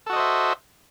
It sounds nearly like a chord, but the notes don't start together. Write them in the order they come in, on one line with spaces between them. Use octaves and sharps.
A4 F#4 D#5 C5 E5